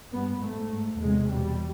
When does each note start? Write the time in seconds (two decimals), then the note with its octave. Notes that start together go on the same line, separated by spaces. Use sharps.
0.13 G2 B3
0.42 G#2 A3
0.72 G#2
1.01 E2 C3 G#3
1.30 E2 B2 G3